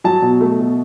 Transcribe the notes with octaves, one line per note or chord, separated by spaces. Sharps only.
F#3 A5
B2
A3
B2